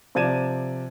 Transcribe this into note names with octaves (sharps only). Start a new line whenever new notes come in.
C3 F3 D5 G#6 D#7 E7